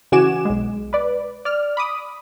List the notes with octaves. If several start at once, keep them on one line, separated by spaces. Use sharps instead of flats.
C#3 E3 F#4 G#5 D6 E7
B1 G#3
B4 D5
D5 F6
B5 D6 D#6